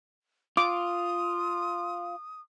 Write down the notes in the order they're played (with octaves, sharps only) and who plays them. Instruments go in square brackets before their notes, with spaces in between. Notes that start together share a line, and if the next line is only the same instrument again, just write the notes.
[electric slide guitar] F4 [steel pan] D6 [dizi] D#6